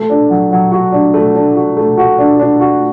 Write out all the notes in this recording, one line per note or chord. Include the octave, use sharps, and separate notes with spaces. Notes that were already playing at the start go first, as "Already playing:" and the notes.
Already playing: A3
D4
F#3
F#3
F#4
D4
A3
D4
F#4
A3
F#4
D4
D4
F#4